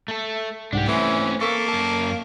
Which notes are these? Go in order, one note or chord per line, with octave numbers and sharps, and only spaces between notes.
A3 A4
C2 G#2 D4 G4 F#5
E3 A3 C4 C#4
A#3 A4 C#6 B6
F#2 A5